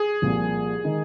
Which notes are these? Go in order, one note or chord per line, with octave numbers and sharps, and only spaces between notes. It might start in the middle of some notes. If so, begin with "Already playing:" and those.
Already playing: G#4
C2 A#2 F3
D#3 G#3 D#4